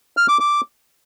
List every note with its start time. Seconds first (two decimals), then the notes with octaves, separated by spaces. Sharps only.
0.17 F6
0.29 D6
0.40 D6